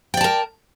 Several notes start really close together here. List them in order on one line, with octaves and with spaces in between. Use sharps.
G5 D5 A5 A#4